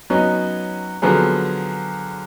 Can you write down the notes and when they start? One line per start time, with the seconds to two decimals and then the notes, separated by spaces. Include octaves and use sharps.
0.10 F#3 B3 C#4 D#4
1.02 D3 F3 F#3 B3 G#4